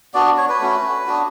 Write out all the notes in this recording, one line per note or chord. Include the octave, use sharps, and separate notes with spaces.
B3 D4 F#4 D5
C#5
B4
A3 C#4 F#4
B3 D4 F#4